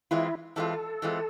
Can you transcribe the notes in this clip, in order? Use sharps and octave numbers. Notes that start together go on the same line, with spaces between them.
E3 G#3 C4 E4 F4
E3 G#3 C4 F4 A4
E3 G#3 C4 F4